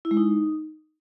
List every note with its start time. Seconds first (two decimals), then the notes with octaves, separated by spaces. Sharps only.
0.05 E4
0.11 G#3
0.17 D#4